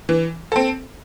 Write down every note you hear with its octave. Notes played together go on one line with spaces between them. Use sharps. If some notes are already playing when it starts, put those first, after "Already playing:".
E3
C4 A4